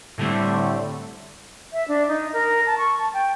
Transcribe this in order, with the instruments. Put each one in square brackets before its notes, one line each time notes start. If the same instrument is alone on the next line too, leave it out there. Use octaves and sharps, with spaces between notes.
[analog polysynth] A2 D3 G3 A3 C4
[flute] E5
D4
D#4
A#4
A5
C#6
A5
G5